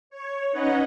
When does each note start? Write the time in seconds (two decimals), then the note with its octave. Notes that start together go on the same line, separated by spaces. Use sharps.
0.10 C#5
0.52 C#4 D#4 B4 C#5 D#5 F#5